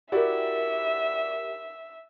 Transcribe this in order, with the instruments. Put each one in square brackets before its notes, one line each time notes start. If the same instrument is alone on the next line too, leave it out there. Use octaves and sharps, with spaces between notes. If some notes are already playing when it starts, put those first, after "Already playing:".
[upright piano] E4 F#4 D5 [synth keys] G4 A#4 [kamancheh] E5